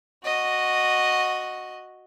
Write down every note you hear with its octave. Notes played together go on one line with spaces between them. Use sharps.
F#4 D#5